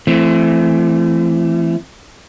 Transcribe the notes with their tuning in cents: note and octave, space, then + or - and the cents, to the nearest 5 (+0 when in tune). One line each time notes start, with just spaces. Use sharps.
E3 +35 A3 +0 C4 +0